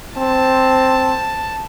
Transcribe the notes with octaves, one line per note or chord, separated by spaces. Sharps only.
C4 A5